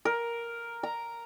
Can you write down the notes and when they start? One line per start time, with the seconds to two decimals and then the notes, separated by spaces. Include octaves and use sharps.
0.05 A#4
0.83 A#5